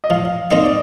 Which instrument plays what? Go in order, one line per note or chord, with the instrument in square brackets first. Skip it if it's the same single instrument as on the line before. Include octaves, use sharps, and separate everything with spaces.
[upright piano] D#5
[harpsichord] F3 [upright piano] F5
[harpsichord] C4 D#4 A#4 F5 [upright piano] D#5
[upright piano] D5